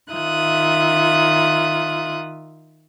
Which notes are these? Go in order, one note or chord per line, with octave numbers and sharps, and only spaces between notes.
D#3 F4 E5 D#6 F#6